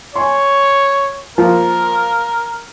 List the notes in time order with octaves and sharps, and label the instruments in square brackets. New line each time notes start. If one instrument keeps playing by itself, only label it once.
[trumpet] C#5 [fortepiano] G#5 C6
[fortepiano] F3 A#3 F4 [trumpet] A#4